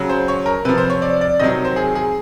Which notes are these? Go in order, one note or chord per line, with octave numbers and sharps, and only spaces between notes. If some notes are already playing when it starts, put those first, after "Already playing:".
Already playing: C#3 F#3
C5
C#5
A#4
C3 F3 B4
C5
C#5
D5
D5
C3 D#3 F#3 D#5
C5
G#4
G#4